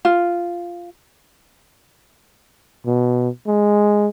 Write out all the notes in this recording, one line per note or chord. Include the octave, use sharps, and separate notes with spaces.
F4
B2
G#3